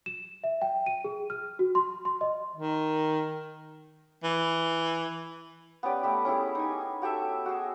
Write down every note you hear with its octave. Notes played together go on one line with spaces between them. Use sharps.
E7
E5
G5
D#7
G#4
F6
F#4
C6
C6
D#5
D#3
E3
B3 C#4 G4 D5
A3 B3 G4
C#4 E4 G4 G#4
D#4 G#5
F#4 G4 A4 E5
F#4 G#4